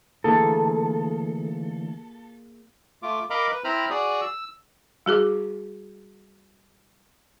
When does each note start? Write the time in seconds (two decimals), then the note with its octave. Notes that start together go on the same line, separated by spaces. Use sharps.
0.24 D3 E3 A3 A#3 F4 G#4 A4
3.02 A3 F4 D6
3.30 A#4 D#5 F5 A#5 B5 D6
3.51 B4
3.64 C4 E4 C5 A#5 B5 F6
3.90 F#4 G#4 D5 D#6
4.21 E6
5.06 G3 F#4 G#4 D6